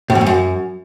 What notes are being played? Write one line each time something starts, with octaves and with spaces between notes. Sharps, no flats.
A2
E2
G2
F#2